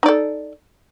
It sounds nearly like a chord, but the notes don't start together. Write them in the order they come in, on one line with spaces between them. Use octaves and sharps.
D#4 D5 A4